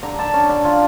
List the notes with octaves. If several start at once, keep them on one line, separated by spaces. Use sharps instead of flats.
D3 A#5
D3 A5
C#4
D3
F4